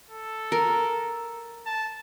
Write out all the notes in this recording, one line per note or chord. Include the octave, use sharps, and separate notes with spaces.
A4
A#4
A5